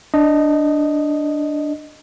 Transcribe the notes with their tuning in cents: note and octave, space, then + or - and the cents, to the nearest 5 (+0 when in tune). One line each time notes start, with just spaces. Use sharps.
D4 +0 D#5 +0